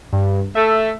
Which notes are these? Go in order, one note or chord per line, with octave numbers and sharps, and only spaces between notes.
G2
A3 A4 E5